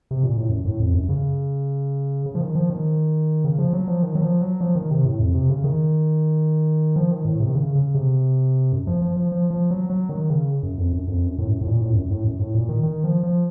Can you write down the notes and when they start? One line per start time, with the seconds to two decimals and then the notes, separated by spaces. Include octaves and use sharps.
0.11 C3
0.23 A#2
0.37 A2
0.49 F#2
0.65 A2
0.80 F2
0.94 F#2
1.09 C#3
2.26 C#3
2.35 F3
2.41 D#3
2.55 F3
2.70 D#3
3.44 C#3
3.58 F3
3.73 F#3
3.88 F3
4.03 D#3
4.15 F#3
4.22 F3
4.41 F#3
4.61 F3
4.75 D#3
4.91 C3
5.05 A2
5.19 F2
5.34 C3
5.50 C#3
5.64 D#3
6.96 F3
7.11 D#3
7.25 A2
7.40 C3
7.49 D#3
7.55 C#3
7.75 C#3
7.94 C3
8.72 F#2
8.87 F3
9.02 F3
9.16 F3
9.32 F3
9.50 F3
9.71 F#3
9.90 F#3
10.09 D#3
10.30 C#3
10.63 F#2
10.78 F2
10.93 F#2
11.08 F2
11.27 F#2
11.38 A2
11.46 F#2
11.61 A2
11.67 A#2
11.81 A2
11.91 F2
11.95 F#2
12.10 A2
12.24 F#2
12.39 A2
12.55 A#2
12.69 D#3
12.83 D#3
13.04 F3
13.23 F3